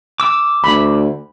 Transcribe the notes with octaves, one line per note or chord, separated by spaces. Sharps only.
D6 E6
D2 B5